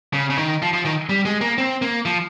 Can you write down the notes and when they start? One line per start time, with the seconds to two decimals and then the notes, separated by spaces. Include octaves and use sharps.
0.13 C#3
0.30 C#3
0.38 D#3
0.62 F3
0.73 F3
0.85 D#3
1.09 G3
1.25 G#3
1.41 A#3
1.58 C4
1.82 A#3
2.05 F3